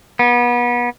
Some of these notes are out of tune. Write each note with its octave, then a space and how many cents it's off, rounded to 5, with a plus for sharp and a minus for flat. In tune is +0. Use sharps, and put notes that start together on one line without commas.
B3 -30